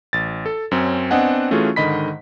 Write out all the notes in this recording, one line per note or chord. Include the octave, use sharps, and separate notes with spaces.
A1 A6
A4
F#2 C4 C#4
B3 C4 D4 D#5 F#5 G#5
E3 A3 C#4 F4 F#4 G#4
G#2 D3 D#3 D#5 B5 B6